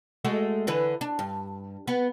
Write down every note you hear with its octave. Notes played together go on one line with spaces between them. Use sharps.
G#3 A3 F#4
D3 E3 B4
D4
G2
B3